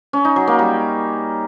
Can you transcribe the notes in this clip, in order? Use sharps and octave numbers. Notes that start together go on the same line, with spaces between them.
C#4
D#4
F#3
A#3
G3